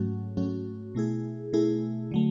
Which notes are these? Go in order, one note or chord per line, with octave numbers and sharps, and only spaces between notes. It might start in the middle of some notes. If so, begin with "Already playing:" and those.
Already playing: G#2 F#3 A3 C#4 F#4
G#2 F#3 A3 C#4 F#4
B2 A3 E4 G#4
B2 A3 E4 G#4
D3 F#3 A3